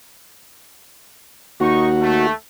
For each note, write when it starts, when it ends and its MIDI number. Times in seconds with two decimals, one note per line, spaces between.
1.60 2.28 39
1.60 1.88 63
1.60 2.27 66
1.60 1.88 85
2.01 2.32 57